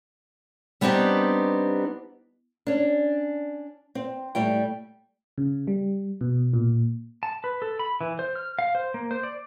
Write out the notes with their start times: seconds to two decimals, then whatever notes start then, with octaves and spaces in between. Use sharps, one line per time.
0.81 G3 B3 C4 D4 D#4 G4
2.67 C#4 D4
3.95 C4
4.35 A2 G3 A3 G5
5.38 C#3
5.67 G3
6.21 B2
6.53 A#2
7.23 A5
7.44 B4
7.62 A4
7.79 B5
8.01 E3
8.19 C5
8.36 F6
8.59 F5
8.75 C5
8.94 A#3
9.11 C5
9.23 D5